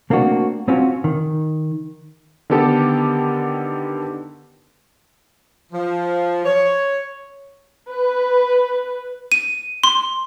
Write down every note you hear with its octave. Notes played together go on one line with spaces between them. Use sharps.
A3 A#3 C4 D4 F#4
C4 C#4 F4 F#4
D#3
D3 D#3 B3 G4 A4
F3
C#5
B4
D#7
C6